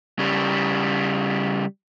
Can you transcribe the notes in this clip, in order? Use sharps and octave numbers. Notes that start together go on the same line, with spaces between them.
C#3 G3